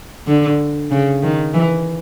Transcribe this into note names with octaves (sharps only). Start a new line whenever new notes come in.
D3
C#3
D#3
E3